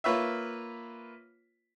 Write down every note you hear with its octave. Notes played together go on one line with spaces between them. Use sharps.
A#3 F4 B4 C#5 E5